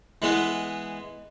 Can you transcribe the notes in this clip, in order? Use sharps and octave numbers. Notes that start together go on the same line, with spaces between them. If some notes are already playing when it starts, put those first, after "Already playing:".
E3 G#3 B3